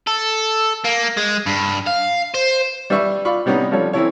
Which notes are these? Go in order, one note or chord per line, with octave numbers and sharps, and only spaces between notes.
A4
A#3
G#3
G2
F5
C5
G3 D4 B4 E5 C#6
F4 D5 B5 C#6
C3 G3 B3 C#4 D#4
F3 G3 C#4 A4 C#5
E3 C4 C#4 E4 A4 C#5